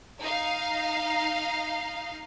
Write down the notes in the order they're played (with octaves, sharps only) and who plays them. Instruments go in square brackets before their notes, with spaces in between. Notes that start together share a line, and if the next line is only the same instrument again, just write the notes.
[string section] D#4 F5